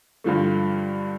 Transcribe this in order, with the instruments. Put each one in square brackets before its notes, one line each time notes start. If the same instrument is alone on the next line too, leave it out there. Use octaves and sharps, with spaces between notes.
[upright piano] G2 D3 F3 A3